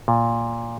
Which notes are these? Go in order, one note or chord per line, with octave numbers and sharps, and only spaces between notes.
A#2